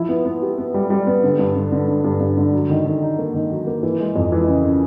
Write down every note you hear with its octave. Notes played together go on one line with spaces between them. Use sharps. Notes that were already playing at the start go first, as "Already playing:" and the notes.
Already playing: F3 E4
B3
B3
G4
B3
G3
G3
B3
D3
G2
D3
D3
D3
G2
G2
D3
F#3
D#3
D#3
D#4
A#3
D#3
F#3
A#3
E3
G#3
F2
E3
C#3
C#3